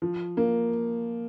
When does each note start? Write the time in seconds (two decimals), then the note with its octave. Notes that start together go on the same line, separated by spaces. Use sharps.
0.02 F3
0.37 A#3